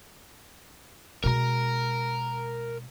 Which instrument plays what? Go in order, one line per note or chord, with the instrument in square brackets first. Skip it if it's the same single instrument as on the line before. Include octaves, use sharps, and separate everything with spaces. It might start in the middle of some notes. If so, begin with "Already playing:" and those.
[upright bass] B2 G#3 [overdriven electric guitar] A#4 A#5